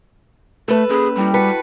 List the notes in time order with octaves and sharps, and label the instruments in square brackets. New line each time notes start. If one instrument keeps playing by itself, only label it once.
[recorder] A3 [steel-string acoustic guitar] A4 B4
[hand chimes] A#3 C#4 B5 [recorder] G#4
[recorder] G3 [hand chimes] E4 G5 B5
[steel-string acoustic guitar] F#4 B4 [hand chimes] A5 B6 C#7